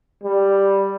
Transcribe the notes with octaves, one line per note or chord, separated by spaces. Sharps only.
G3